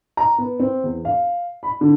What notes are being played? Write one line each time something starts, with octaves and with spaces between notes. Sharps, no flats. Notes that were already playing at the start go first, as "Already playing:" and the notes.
A#5
B3
C4
E2
F5
B5
D3